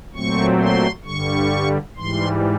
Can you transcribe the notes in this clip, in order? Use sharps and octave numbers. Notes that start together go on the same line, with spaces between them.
A#2 F#3 A3 C4 C#6
C6
G2 D3 G3 C#6
G#2 E3 G3 C6